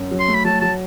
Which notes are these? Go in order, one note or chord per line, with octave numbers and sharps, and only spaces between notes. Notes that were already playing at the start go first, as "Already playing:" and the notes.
Already playing: F#2
F#3
C6
A3
B5
F#3 A5
F#3 A5